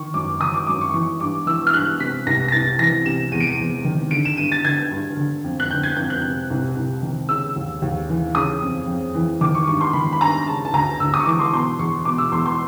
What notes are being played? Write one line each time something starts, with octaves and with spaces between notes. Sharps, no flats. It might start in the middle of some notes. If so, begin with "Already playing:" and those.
Already playing: D#3 C#6
F#2 D6
D#3 D#6
D6
F#2 D6
C#6
E3 C#6
G2 D6
E3 E6
F6
G2 F#6
C3 B6
C2 A#6
A#6
C2 A6
E3 A#6
C3 E7
E2 D#7
D7
D#7
E2
D#3
D3 D7
E7
G2 D#7
A6
D3 G#6
G2
D3
F2
F#6
D3 G6
G#6
F2 G6
F#6
C3
C2
C2
D#3
C#3 E6
D#2
D#2
E3
C#3 D#6
F2
F2
E3
D#3 D6
C#6
G2 C#6
C6
D#3 B5
B5
G2 A#5
C#3 A5
A5
D2 A#5
D2 E6
D#6
C#6
E3 D6
C6
B2 C6
E2 C#6
B2 D6
E6
E2 C6
C6